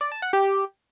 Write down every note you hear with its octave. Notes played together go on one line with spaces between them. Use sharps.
D5
A5
F#5
G4